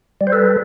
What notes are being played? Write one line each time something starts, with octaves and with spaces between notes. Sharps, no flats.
G3
C5
A4 B4